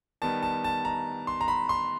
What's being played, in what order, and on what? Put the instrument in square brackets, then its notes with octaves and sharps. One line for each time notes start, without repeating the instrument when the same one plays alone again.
[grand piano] D#3 G3 B3 A5
A5
A5
A#5
C6
A#5
B5
C6